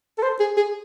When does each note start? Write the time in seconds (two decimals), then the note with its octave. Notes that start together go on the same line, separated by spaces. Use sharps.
0.18 A4
0.23 C5
0.40 G#4
0.57 G#4